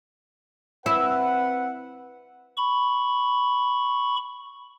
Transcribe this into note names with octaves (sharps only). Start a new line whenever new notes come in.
C4 E4 B4 F#5
B5 C#6